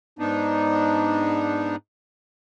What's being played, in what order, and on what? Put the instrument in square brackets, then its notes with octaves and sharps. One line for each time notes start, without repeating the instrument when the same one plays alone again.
[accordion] G#2 B3 D4 D#4